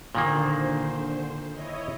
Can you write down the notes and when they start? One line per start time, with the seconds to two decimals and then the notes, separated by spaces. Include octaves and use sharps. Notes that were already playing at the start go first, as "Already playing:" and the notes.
0.15 A#2 D3 D#3 A#3 C5
1.51 E4 C#5 D#5